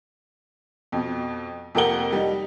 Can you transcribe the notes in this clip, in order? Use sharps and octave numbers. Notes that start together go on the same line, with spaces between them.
F2 B2
F2 C3 A#3 A#4 F#5 G7
G3 D#4